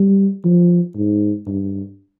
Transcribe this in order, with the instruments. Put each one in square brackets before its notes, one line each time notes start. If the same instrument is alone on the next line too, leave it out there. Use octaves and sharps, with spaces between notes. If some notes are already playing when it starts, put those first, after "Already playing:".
Already playing: [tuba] G3
F3
G#2
G2